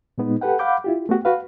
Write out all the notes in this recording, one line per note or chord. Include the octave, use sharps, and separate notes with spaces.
A#2 G#3 B3 D#4
G4 A4 B4 F#5 G5
F5 F#5 B5 D6 G6
E4 F4 G4
A3 B3 F#4 G4
F#4 B4 F5